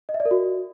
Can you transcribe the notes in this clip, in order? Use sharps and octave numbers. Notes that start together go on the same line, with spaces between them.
D#5
E5
D5
A#4
F#4